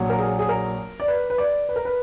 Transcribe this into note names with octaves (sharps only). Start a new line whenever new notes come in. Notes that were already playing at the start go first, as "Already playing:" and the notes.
Already playing: A#1 A#2 F#3
A#4
G#4
G#4
A#4
D5
B4
B4
D5
B4
A#4
B4